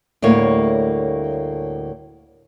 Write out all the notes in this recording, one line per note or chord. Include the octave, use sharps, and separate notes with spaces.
D2 A2 G3 A#3 C#5